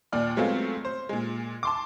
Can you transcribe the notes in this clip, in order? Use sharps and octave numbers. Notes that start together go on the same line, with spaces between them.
D#2 A#2 D5 F6
F#3 G#3 A3 B3 C4 F4
C5
A#2 G#3
A5 C6 D6